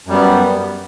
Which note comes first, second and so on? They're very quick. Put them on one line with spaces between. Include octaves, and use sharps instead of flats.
F#2 G3 B3